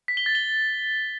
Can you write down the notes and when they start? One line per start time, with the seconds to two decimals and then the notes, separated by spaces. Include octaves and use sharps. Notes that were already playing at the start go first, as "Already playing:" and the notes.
0.08 B6
0.17 G7
0.26 A6
0.35 G7